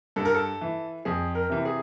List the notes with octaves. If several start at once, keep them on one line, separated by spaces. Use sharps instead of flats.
G2 A4
A#4
A4
E3
F2 G#4
A#4
C3 E3
G#4